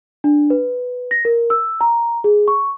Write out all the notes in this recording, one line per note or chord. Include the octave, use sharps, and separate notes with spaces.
D4
B4
A#6
A#4
E6
A#5
G#4
C#6